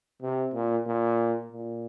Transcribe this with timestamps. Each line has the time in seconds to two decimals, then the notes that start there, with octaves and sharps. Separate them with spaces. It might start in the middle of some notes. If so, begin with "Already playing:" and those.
0.22 C3
0.54 A#2
0.87 A#2
1.52 A#2